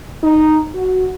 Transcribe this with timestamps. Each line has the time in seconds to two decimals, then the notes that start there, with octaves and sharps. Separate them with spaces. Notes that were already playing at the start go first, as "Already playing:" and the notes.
0.23 D#4
0.75 F#4